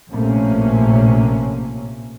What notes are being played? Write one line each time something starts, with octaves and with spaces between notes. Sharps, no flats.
A#1 A2 C3 A3 A#3 C#4